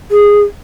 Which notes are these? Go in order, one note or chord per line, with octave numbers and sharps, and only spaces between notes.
G#4